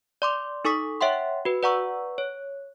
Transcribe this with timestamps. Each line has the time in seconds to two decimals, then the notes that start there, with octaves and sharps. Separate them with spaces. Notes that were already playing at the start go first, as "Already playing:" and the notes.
0.22 D5 C6 D6
0.65 D#4 A4 C#6 D#6 B6
1.01 C#5 E5 F#5 G5 C6
1.45 F#4 B4
1.63 B4 D5 F#5 A#5 C#6 E6
2.18 C#5